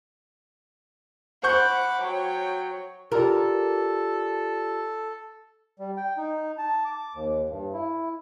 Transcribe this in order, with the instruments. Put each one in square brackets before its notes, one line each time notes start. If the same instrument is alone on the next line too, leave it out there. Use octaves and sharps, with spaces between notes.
[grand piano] C5 C#6 G6 [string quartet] F#5 B5 D6
[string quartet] F#3 C#5 G5
[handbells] F4 G4 D5 [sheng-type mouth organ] A4 [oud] A#4
[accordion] G3
G5
D#4
A5
D6
D#2
G2
E4